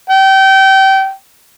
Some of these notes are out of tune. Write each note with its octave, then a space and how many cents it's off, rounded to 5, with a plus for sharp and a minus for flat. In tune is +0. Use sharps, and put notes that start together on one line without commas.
G5 -25